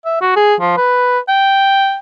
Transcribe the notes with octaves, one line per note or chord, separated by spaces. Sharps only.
E5
F#4
G#4
F3
B4
G5